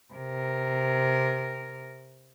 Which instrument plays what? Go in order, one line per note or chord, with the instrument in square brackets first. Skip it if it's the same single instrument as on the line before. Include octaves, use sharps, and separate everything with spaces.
[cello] C3 A#4